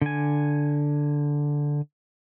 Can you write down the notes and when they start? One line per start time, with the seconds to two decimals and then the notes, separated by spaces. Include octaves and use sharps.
0.02 D3 G#5